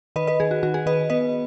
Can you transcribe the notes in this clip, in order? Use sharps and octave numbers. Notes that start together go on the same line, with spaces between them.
D#3 B4 D#5
B4 D#5
D#3 G#4
F#4
D#3 F#4
G#4
D#3 B4 D#5
B3 B4 D#5